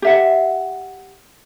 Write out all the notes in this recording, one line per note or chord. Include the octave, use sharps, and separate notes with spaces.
G4 E5 F#5